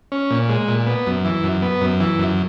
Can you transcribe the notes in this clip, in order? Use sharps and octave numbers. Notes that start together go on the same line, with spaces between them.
C#4
A#2
G#3
A#2
B3
F#2
E3
F#2
B3
F#2
E3
F#2